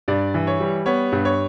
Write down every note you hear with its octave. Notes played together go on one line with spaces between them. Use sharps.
G2 D5
E3
C#5
G3
B3 C#5
G2
C#5